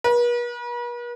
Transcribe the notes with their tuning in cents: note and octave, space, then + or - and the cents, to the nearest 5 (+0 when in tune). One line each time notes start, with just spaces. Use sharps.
B4 -45